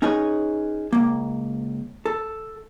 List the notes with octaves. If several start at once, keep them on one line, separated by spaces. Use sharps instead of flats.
C#4 D#4 G#4 B4 C#5
C#2 A#3
A4